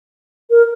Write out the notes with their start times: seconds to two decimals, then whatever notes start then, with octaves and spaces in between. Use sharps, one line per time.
0.50 A#4